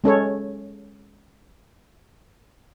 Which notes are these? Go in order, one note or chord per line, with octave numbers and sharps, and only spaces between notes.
G#3 C#4 A4 C#5